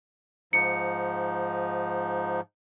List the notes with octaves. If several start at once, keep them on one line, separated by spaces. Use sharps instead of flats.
G#2 F3 D#4 C#7